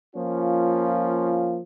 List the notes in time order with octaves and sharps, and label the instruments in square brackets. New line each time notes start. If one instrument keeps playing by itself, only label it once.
[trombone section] F3 A#3 C#4 F4